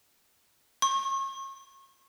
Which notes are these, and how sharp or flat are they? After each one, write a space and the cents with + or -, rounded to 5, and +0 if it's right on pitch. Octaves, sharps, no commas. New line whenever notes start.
C#6 -35